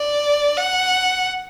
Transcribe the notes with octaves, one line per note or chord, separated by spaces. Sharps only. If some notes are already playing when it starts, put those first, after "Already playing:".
Already playing: D5
F#5